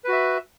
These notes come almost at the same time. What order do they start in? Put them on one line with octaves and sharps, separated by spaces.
B4 F#4 E5